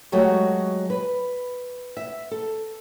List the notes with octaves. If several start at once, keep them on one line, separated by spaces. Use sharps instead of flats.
F#3 G#3 A3 F#4 G4
B4
E5
A4